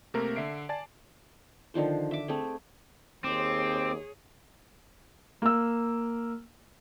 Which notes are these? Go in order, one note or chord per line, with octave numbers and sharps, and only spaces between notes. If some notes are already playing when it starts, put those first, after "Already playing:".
C3 A3 A#3 C4 A#4
D3 E5 C7 D7
D5 G#5 A5 A6
D3 D#3 F3 C5
E5 D6
A3 C4 G#4
D#2 C4 G#4 C#5 D6
A#3 E6